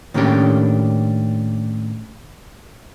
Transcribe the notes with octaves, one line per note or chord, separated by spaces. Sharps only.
A2 D#3 A#3 C#4 D4 G4